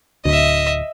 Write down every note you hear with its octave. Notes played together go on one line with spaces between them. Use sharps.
D1 D2 D#5 E5